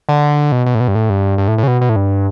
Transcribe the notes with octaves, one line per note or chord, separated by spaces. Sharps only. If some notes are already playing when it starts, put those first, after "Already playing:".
D3
B2
B2
A2
B2
G2
A2
G2
G2
A2
A2
C#3
B2
B2
A2
G2